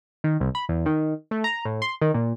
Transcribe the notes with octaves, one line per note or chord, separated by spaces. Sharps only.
D#3
C2
B5
E2
D#3
A3
A#5
A2
C6
D#3
A#2